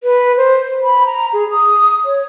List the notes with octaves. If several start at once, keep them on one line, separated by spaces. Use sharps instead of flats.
B4
C5
B5
A#5
G#4
D#6
C#5